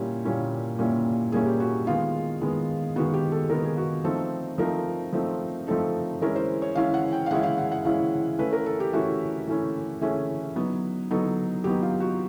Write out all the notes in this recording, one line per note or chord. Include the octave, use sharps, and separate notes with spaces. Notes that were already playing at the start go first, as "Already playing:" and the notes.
Already playing: A#2 G3 A#3 C#4 E4 G4
A#2 G3 A#3 C#4 E4
A#2 G3 A#3 C#4 E4
A#2 G3 A#3 C#4 E4 G#4
G4
F#4
D#3 G#3 B3 F4
D#3 G#3 B3
D#3 G#3 B3 F#4
G4
A4
D#3 G#3 B3 A#4
G#4
F#4
F3 A3 C4 D#4 A4
F3 A3 C4 D#4 A#4
F3 A3 C4 D#4
F3 A3 C4 D#4 A4
E3 G#3 C#4 E4 A#4
C5
C#5
E3 G#3 C#4 E4 F5
F#5
G5
F5
E3 G#3 C#4 E4 F#5
F5
F#5
F#5
E3 G#3 C#4 E4 F5
E3 A3 C#4 E4 B4
A#4
A4
G4
E3 A3 C#4 E4 F#4
E3 A3 C#4 E4
E3 A3 C#4 E4 G#4
F#3 B3 D#4
F#3 B3 D#4 A4
F#3 B3 D#4 G4
F4
F#4